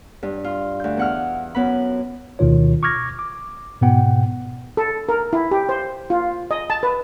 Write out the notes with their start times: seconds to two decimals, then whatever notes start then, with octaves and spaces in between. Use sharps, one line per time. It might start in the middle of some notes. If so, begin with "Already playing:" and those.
0.23 G2
0.44 F4
0.80 D2 G6
0.97 E2 F#5 F6
1.55 F#2 B3 B5
2.39 D2 B2 D#3 F4 C#5
2.83 C#6 D6 F6 G#6 A#6
3.19 D6
3.81 G#2 B2 B3 F#5 G5
4.77 A4
5.09 A#4
5.33 E4
5.51 G4
5.69 C5
6.10 F4
6.51 D#5
6.70 A5
6.83 B4